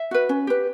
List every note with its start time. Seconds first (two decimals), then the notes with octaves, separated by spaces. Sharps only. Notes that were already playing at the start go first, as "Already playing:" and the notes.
Already playing: E5
0.11 F#4 B4
0.29 C#4
0.47 G4 B4